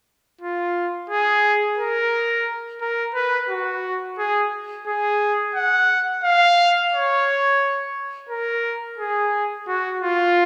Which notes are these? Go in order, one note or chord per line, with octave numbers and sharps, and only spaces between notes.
F4
G#4
A#4
A#4
B4
F#4
G#4
G#4
F#5
F5
C#5
A#4
G#4
F#4
F4